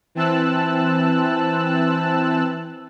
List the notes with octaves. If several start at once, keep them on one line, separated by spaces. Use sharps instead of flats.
E3 C4 A5 E6 F#6